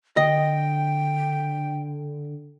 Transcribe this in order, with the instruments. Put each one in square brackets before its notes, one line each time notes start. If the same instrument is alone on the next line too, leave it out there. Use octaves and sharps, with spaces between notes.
[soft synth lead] D3 [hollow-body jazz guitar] D#5 [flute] G5